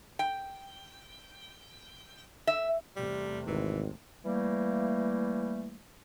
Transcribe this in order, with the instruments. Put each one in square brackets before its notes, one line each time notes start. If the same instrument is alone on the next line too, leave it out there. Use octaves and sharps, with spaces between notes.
[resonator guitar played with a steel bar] G5
E5
[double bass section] E2 C3 A3 [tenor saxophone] G3
[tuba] G#1 [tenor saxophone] E3
[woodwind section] E3 G3 A3 A#3